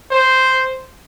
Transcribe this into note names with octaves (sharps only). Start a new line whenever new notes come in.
C5